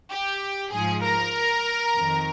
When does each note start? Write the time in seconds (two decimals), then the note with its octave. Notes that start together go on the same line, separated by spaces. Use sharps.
0.11 G4
0.72 G#2 F3 G#4
1.03 A#4
1.95 F2 D#3